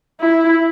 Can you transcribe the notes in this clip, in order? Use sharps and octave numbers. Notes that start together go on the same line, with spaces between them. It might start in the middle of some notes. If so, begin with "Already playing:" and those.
E4